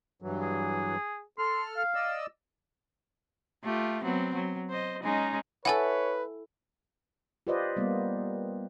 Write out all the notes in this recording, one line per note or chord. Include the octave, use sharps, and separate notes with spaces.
G2 E3 F#3
G#4
A4 C6 F6
F5
D5 D#5 E6
A3 F4 G4
F#3 B3 C4
F#3
C5 D#5
G#3 C#4 D#4
E4 A4 B4 C#5 F#5 G#5
F4 G4 B4 C5 D5 D#5
G3 A#3 B3